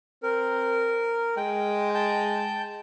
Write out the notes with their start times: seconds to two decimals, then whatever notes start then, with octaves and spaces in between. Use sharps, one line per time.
0.23 C4 A#4
1.37 G#3 G5
1.95 G5 A5 G6